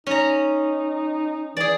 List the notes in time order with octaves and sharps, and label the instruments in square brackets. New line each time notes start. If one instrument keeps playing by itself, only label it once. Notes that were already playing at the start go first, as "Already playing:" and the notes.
[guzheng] C#4 A#5 [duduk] D#4
[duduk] E3 [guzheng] G#4 D5